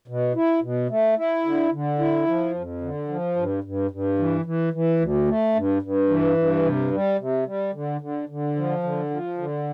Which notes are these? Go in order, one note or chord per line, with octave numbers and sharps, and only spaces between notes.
B2
E4
B2
A3
E4
D3
D3
E4
F3
F2
D3
F3
G2
G2
G2
E3
E3
E3
D2
A3
G2
G2
E3
G2
C3
G3
C3
G3
D3
D3
D3
F3
D3
F3
D3